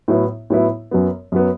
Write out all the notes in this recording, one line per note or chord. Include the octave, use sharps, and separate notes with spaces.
A2 F#3 B3 E4
A2 F#3 B3 E4
F#2 F#3 B3
F#2 F#3 B3